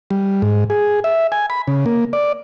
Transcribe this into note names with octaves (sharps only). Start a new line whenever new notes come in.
G3
G#2
G#4
E5
G#5
B5
C#3
A#3
D5